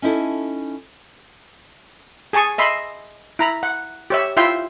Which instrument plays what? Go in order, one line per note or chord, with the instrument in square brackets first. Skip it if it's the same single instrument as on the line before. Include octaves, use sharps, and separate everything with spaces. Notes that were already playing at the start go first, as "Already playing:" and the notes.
[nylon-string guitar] C#4 D#4 E4 A4
[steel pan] G#4 G#5 A5 C#6
D#5 E5 B5 C6
E4 A#5 B5
F#5
G4 C#5 E5
E4 F4 E5 G5 C6